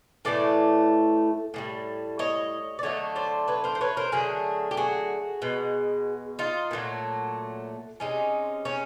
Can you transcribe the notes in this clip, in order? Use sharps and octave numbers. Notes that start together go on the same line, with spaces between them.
A2 E3 A3 D5
A2 E3 G3
C#5 D#5
D5
D3 F#3 A3 C#5 D#5
C5 D5
B4 C#5
A#4 C5
C5
B4 C#5
A#4 C5
D3 F#3 A3 G#4 A#4
G4
F#4 G#4
B2 G#3
D#4 F4
A#2 F#3 A3
C3 D#3 G#3 C#4 D#4
C#4 D#4